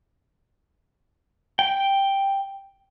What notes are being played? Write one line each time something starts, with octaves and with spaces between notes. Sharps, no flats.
G5